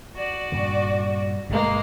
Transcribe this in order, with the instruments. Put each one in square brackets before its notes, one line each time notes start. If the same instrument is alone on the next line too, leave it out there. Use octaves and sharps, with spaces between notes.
[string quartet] F#4 D5
[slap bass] G2 A#2 C#3
[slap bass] G1 G2 B2 [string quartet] G#3 A#3